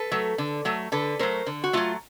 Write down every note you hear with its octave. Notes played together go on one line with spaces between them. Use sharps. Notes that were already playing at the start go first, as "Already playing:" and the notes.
Already playing: A4 B4
F#3 A3
D3
F#3 A3
D3 A4 B4
F#3 A3 A#4 C5
D3
F#4
F#3 A3 D#4 F4